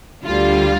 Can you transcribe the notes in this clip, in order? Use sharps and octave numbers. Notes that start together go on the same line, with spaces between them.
D2 D3 G3 F4